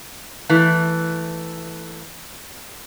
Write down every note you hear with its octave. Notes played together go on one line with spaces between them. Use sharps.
E3 A3